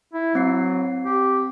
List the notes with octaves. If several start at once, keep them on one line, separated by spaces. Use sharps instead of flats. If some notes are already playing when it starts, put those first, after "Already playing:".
E4
F#3 C4 C7
G4